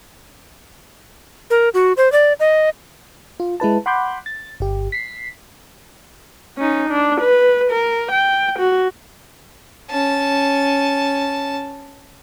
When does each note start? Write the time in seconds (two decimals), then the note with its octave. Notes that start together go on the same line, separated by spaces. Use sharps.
1.50 A#4
1.74 F#4
1.97 C5
2.12 D5
2.40 D#5
3.40 F4
3.60 G#3 E4 B4 A5
3.86 F#5 B5 C6 D6 F#6 G6
4.26 A6
4.60 G1 G4
4.92 B6 C7
6.57 C#4 D#4
6.89 D4
7.20 B4
7.70 A#4
8.11 G5
8.59 F#4
9.90 C#4 A5